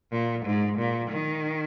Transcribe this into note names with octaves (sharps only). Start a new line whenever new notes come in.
A#2
G#2
A#2
D#3